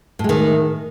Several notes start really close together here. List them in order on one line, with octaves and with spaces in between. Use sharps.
A2 G#3 D#3